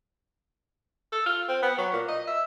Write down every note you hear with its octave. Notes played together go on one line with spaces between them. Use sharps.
A4
F4
C4
B3
F#3
A#2
D#5
E5